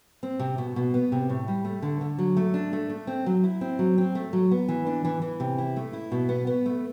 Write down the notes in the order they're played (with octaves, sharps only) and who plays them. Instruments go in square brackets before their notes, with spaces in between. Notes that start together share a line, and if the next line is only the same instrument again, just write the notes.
[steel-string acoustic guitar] C4
C3
B2
B2
B3
C3
A2
G3
A3
D3
D3
F#3
A3
D4
A3
A3
C4
F#3
E4
C4
F#3
C4
A3
F#3
B3
E3
D4
E3
E3
C3
E4
A3
E4
B2
B3
B3
A3